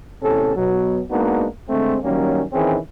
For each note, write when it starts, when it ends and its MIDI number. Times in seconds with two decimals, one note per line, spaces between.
0.23 0.55 33
0.23 0.55 40
0.23 0.55 48
0.23 0.55 61
0.23 0.55 69
0.56 1.01 47
0.56 1.01 54
1.10 1.46 56
1.10 1.46 58
1.10 1.46 59
1.10 1.46 62
1.10 1.46 63
1.10 1.46 66
1.68 1.97 50
1.68 1.97 56
1.68 1.97 57
1.68 1.97 60
2.03 2.42 51
2.03 2.42 54
2.03 2.42 55
2.03 2.42 58
2.03 2.42 61
2.53 2.77 51
2.53 2.77 52
2.53 2.77 60
2.53 2.77 61
2.53 2.77 68